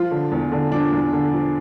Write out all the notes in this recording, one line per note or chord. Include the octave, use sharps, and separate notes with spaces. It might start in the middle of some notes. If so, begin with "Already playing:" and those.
Already playing: F3 F4
D3
E2
D3
F3 D4
E2
D3
F3